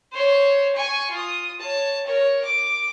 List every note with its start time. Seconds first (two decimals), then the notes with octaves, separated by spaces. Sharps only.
0.12 C5 C#5
0.75 G#5 C#6
1.11 F4 D#6
1.59 C#5 A5
2.06 A#4 C#5
2.45 D6